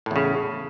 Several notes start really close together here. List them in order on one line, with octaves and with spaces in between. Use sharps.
A2 E2 C#3